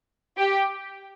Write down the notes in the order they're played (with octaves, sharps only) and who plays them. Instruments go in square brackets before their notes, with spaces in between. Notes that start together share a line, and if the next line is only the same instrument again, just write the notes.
[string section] G4